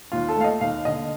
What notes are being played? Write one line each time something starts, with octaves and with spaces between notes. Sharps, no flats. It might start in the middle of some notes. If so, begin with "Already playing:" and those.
D#2 F4
A4
A3 F5
D#5
D#2 F5
D3 D#5